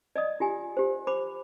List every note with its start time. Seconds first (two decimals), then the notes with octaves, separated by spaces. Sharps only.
0.16 D5 D#5 D#6
0.40 F4 G4 G#5
0.77 G4 C5
1.07 C5 B5 D6